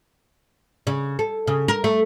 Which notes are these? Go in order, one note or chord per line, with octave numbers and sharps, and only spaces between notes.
C#3
A4
C#3
A#4
A3